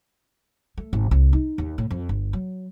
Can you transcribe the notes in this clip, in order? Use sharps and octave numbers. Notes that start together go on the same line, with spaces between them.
A3
G#1
C2
D#4
D#2
A2
F2
G1
F#3